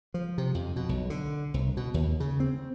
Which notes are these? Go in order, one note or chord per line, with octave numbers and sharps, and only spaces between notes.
F3
C3
F2
B2
B1
D3
C2
B2
D#2
C#3
C4